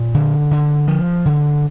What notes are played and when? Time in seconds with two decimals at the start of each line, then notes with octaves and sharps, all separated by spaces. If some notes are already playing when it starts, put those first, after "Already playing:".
Already playing: A#2
0.14 D3
0.51 D3
0.88 F3
1.25 D3